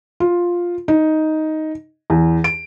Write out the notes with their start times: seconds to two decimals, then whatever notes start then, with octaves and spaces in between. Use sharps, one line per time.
0.20 F4
0.88 D#4
2.10 E2
2.44 D7